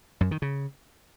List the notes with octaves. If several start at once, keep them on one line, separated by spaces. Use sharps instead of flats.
F#2
D#3
C#3